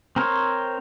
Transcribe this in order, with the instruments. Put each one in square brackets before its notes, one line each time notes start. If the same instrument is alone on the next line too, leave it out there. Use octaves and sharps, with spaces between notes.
[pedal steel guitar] C4 A#4 C5 C#5